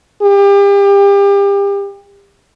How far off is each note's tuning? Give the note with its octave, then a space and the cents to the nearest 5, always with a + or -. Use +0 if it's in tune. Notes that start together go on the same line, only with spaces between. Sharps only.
G4 +35